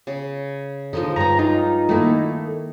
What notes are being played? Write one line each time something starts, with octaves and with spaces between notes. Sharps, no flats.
C#3
D3 F3 G#3 D#4
G2 G#3 C#5 A#5
D#4 F4
D#3 A3 A#3 E4